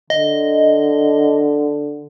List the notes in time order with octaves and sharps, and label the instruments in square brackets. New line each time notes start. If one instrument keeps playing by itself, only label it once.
[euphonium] D3 [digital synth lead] D#5